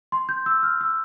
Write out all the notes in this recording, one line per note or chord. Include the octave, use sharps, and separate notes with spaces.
C6
G6
E6
F6
E6